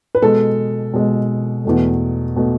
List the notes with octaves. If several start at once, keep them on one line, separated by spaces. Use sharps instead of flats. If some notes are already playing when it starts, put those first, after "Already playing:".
B4
B2 G#3 A4
B2 G#3
E2 B2 A3
B2 A3